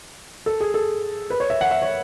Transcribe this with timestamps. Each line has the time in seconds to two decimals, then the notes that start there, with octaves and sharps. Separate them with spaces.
0.46 A4
0.60 G#4
0.74 A4
1.30 B4
1.40 C#5
1.50 E5
1.61 F#5
1.71 E5
1.82 C#5